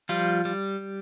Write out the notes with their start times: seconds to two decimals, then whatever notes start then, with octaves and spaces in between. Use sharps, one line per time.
0.09 F3 G3 F4
0.45 G3